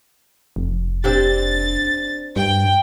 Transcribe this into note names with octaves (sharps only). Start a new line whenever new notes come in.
F1
C4 D4 G4 A6
G2 G5